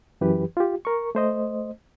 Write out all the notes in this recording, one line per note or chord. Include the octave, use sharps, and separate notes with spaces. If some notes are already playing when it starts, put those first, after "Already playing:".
F#2 E3 G4 B4
F4 G4
A#4 C#6
A3 C5 D#5